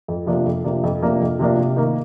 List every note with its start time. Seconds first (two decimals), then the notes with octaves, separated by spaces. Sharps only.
0.08 F2
0.26 C3 F3 A#3 D4
0.46 F2
0.64 C3 F3 A#3 D4
0.83 F2
1.02 C3 F3 A#3 D4
1.21 F2
1.39 C3 F3 A#3 D4
1.58 C3
1.76 D#3 A#3